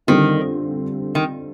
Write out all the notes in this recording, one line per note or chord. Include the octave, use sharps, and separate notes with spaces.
D3 D#3 G3 C4 F4
D#3